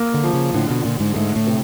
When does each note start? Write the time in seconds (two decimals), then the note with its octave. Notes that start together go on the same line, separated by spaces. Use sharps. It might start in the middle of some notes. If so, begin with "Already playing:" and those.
Already playing: A#3
0.14 D3
0.24 F3
0.33 C#3
0.54 A2 D3
0.70 B2
0.84 A#2 D3
1.00 G#2
1.15 G#2 A3
1.36 A2
1.47 C3